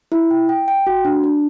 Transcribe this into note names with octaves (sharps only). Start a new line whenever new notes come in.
E4
G5
G5
G5
F#4
D4
D4